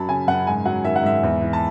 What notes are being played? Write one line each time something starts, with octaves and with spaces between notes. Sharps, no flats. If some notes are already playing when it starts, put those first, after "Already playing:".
Already playing: F#2 F#3 A5 B5
C#3 G#5
F#2 F#5
G#2 G#5
F#3 F#5
D#3 E5
F#5
G#2 E5
E2
E3
A5